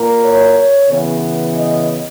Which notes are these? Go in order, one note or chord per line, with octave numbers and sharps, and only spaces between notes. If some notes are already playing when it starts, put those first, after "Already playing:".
Already playing: A#2 A#3
C#5
C#3 E3 B3
D#5